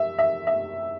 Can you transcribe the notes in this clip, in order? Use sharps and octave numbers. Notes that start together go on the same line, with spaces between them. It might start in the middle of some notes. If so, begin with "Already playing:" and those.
Already playing: E5
E5
E5